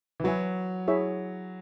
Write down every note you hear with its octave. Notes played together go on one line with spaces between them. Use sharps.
E3
F#3 F#4 B4 E5 G#5
E4 G#4 C#5 E5